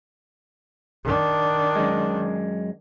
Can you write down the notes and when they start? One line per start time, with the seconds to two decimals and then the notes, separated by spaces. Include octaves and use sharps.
1.04 D#3 D4
1.76 F#2 G#3